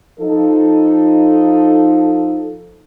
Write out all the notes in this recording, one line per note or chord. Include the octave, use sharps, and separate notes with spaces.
F3 D#4 A4